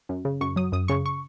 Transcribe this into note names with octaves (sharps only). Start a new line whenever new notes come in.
F#2
C#3
F#2 C#6
F#3 D#6
F#2 D#6
C#3 C#6
C#6